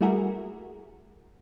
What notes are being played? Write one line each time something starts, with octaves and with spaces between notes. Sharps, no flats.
G3 A3 E4 F#4 G#4 A#4